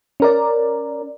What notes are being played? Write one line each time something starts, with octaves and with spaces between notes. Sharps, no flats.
C#4 A#4 D5